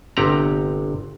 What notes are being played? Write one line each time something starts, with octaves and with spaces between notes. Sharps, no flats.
G1 C3 G4 F#5 A#5